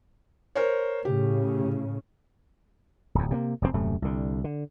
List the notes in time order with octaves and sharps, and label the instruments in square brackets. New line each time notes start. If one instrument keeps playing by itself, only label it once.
[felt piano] A#4 C5 C#5
[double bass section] A2 C#3 [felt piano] G4
[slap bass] D1 E2
C3 A3 A#3
F1 F#2 A#2 C4
D#1 F#2 C3 A3
C2 D3
D3